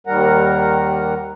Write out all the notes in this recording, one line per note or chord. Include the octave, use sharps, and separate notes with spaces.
D#2 D#3 G3 A#4 F#5 A#5